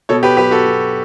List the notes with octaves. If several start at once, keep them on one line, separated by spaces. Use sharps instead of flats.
B2 A4 C#5
G4 B4
F#3 G4 B4
F#4 A4
B2